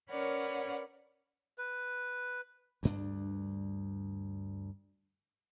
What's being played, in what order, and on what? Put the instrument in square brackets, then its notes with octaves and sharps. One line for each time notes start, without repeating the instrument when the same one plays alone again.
[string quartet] C#4 A#4 B4 C#5 D5 F#5
[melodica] B4
[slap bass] D2 G2 D4